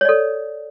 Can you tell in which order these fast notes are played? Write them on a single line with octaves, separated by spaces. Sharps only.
C#5 D5 A4